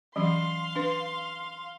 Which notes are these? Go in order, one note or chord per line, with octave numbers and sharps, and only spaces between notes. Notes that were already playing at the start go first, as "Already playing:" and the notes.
E3 F#3 C#4 F5 C6
D4 B4